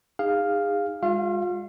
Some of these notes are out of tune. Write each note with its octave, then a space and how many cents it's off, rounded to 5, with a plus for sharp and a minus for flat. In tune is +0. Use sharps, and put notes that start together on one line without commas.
D#4 +0 G#4 -30 F5 +0
G#3 -35 F4 +35 F5 -35